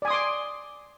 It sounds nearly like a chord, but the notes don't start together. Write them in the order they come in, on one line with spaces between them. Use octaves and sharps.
D5 G#5 D#6 C6 D6